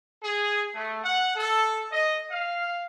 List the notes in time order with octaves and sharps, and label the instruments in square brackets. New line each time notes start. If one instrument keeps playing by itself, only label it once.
[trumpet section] G#4
A3
F#5
A4
D#5
F5